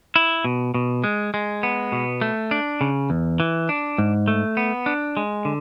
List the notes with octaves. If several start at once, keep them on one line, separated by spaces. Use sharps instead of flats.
E4
B2
B2
G#3
G#3
B3
B2
A3
D4
C#3
E2
E3
D4
G#2
A3
B3
D4
G#3
D3